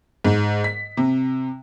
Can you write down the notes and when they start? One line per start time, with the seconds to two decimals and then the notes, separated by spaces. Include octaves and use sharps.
0.25 G#2
0.64 B6
0.97 C3